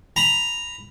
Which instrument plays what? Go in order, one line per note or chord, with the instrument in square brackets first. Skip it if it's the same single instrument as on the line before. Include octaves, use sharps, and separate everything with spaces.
[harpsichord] A#5 B5